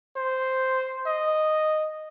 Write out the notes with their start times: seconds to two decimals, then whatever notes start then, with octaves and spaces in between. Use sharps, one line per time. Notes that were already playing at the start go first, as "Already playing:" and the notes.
0.16 C5
1.06 D#5